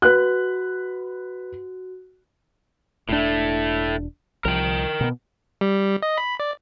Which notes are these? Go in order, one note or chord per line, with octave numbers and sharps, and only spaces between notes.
F#4 B4 F#6
E1 A2 A3 D4
C2 F3 A#4 G5
B2 B3
G3
D#5
B5
D5